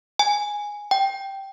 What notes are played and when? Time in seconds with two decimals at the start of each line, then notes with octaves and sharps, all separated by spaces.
0.19 G#5
0.91 G5